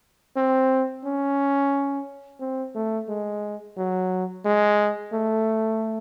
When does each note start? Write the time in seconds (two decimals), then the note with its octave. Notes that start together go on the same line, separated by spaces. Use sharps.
0.36 C4
1.05 C#4
2.40 C4
2.75 A3
3.09 G#3
3.77 F#3
4.45 G#3
5.13 A3